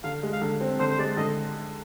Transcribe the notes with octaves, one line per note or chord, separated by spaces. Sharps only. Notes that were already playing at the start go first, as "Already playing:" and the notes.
D3 F5
G#3
F5
D3
C4
D3 C5
C5
G#3 D5
D3 D#5